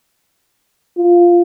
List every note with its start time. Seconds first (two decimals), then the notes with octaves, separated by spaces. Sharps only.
0.97 F4